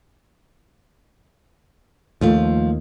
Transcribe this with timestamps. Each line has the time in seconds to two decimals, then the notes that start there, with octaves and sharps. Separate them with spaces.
2.21 D#2 F3 A3 F4